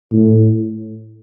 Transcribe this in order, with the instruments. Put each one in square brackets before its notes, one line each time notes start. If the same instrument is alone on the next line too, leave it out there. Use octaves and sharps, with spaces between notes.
[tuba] A2